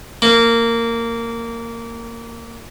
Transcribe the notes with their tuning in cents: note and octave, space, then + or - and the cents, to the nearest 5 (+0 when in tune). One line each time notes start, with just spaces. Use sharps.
A#3 -15